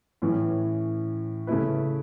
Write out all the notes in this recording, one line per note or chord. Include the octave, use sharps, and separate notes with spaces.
A2 E3 C#4
C#3 A3 E4 B4